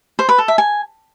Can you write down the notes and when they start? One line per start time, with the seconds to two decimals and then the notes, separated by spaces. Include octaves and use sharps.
0.19 C5
0.29 B4
0.38 A4
0.48 E5
0.58 G#5